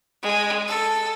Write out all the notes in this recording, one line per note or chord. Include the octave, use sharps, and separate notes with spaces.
G#3
A4